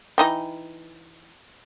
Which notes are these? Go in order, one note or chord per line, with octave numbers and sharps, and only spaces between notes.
E3 D#4 G5